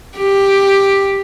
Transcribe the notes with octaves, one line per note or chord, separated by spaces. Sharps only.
G4